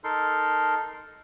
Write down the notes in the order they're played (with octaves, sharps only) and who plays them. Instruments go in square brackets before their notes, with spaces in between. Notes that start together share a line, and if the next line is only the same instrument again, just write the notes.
[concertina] D#4 A4 A#4 C6